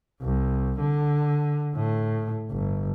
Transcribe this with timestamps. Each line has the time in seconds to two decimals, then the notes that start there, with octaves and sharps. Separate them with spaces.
0.22 C2
0.80 D3
1.76 A2
2.51 G1